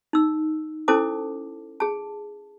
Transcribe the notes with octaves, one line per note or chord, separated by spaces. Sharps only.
D#4 E6
C#4 E4 A4 C5 A5 D6
G#4 A5